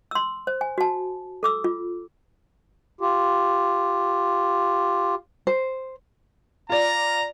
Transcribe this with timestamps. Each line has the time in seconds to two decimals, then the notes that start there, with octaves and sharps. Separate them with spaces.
0.11 C6 E6
0.47 C5
0.61 G#5
0.78 F#4 A5
1.43 A4 D6 E6
1.64 F4
3.01 F4 G4
5.47 C5
6.69 F4 D5 A#5